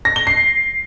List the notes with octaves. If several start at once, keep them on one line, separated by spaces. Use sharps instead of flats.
A#6
G7
C7